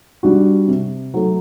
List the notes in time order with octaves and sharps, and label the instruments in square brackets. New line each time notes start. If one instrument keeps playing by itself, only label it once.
[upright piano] G3 D4 F#4
C3
F#3 A3